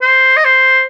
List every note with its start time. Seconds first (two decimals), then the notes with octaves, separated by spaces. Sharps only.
0.02 C5
0.37 D#5
0.45 C5